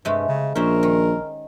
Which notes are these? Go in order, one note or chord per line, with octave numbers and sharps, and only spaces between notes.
G2 C3 G#3 A3
C#3
A#1 C#4 A#4 C5 E5
D#3